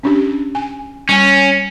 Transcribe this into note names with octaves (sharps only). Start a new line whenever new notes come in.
C#4 D4 G4
G#5
G3 C#4 G#5